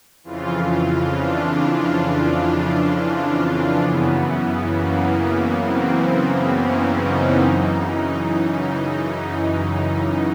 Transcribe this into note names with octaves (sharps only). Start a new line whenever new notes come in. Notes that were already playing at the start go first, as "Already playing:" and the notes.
F2 C#3 E3 F4
D4
F#2 C#3 E3 B3
A#3
C4
C#4
D#4
F#2 C#3 E3 D#4